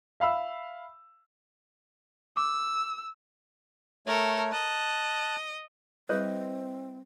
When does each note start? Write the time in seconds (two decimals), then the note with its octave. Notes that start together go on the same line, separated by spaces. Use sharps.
0.20 E5 F5 B5 E6
2.37 D6 E6
4.07 A3 A4 A#4 C#5
4.52 D#5 A5 F#6
6.09 G3 C4 E4 G#4 B4 C#5 D#5